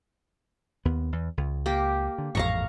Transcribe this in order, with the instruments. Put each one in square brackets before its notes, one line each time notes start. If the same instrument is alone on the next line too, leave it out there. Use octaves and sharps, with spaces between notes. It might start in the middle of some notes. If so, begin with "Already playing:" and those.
[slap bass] D#2 B3
E2
C#2
[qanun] A#3 G4
[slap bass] D3
[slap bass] A1 F2 G#2 [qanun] F5 A#5 C#6